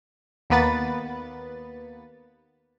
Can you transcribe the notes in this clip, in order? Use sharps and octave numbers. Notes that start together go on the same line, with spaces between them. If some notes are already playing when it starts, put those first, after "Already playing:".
D#2 A#3 B3 B4 A6